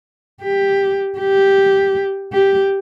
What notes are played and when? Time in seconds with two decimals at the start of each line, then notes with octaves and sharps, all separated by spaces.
0.42 G4
1.19 G4
2.33 G4